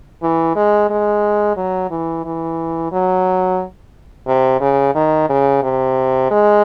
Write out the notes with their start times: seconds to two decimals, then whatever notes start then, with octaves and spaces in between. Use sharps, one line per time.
0.22 E3
0.55 G#3
0.90 G#3
1.57 F#3
1.90 E3
2.25 E3
2.92 F#3
4.27 C3
4.61 C#3
4.95 D#3
5.29 C#3
5.63 C3
6.31 G#3